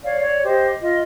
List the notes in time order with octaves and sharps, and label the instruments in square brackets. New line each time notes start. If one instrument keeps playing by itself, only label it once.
[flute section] C#5 D5 F5
C#5 D5
G4 C5 D#5
F4 D#5